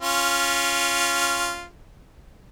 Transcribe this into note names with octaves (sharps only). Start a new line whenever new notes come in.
C#4 F4